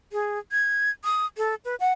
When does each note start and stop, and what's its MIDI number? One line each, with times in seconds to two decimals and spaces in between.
0.12 0.39 68
0.52 0.90 92
1.04 1.26 87
1.37 1.55 69
1.65 1.75 71
1.80 1.93 78